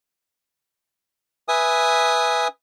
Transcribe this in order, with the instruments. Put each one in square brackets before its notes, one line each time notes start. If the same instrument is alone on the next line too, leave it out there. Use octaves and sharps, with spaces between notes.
[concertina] B4 E5 G#5 D#6